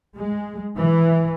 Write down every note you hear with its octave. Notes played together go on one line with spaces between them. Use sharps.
G#3
E3